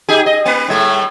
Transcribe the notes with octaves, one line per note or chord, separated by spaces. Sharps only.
D#4 G4 G#4
D#5
A#3 B4
A2 G3 A3